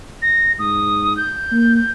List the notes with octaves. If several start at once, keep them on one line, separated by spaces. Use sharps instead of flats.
A#6
G#2 D#6
G6
A#3